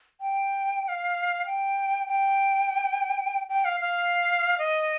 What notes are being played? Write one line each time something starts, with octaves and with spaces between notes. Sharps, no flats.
G5
G5
F5
G5
G5
G5
F5
F5
D#5